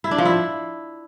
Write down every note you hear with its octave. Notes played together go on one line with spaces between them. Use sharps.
E4
D4
F3
E4